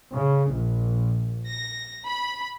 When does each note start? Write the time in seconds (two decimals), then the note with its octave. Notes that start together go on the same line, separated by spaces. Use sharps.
0.13 C#3
0.51 A#1
1.47 A#6
2.06 B5